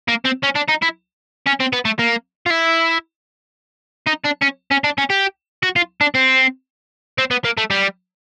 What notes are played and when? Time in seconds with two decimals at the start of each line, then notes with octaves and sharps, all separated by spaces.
0.08 A#3
0.25 C4
0.43 C#4
0.56 D4
0.69 D#4
0.82 E4
1.47 C#4
1.60 C4
1.73 B3
1.85 A3
1.99 A#3
2.46 F4
2.50 E4
4.07 D#4
4.24 D4
4.42 C#4
4.71 C#4
4.84 D4
4.98 C#4
5.10 G4
5.63 F#4
5.76 F4
6.01 D4
6.15 C4
7.18 C4
7.31 B3
7.45 A#3
7.58 A3
7.71 G3